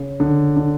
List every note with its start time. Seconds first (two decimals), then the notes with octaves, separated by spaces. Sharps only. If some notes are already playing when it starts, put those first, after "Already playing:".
Already playing: C#3
0.20 D3
0.56 D3